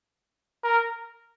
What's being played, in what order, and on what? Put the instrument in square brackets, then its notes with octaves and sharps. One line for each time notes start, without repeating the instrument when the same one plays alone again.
[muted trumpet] A#4